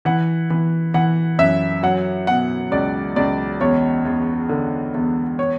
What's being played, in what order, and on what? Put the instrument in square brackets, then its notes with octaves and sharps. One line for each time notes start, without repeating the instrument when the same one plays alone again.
[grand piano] E3 F#5
E3
E3 F#5
F#2 E5
F#3 F#5
B2 F#5
C#2 D5
C#2 D5
E2 C#5
E2
D3
E2
C#5